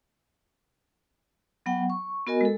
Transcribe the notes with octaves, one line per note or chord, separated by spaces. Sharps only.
F#3 B3 F#5 G5
C#6
B3 F#4 A#4 D#5 G#5
G#3 A4